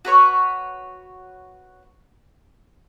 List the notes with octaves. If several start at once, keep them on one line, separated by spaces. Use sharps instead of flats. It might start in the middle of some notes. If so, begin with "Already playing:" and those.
F#4 B4 C#5 C#6